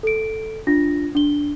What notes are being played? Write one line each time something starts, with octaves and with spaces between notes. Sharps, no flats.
A4 D7
D4 F4 A#6
D4 G7